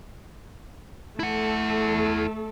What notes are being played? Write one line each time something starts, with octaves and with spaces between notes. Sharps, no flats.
A3 E4 A4 F#5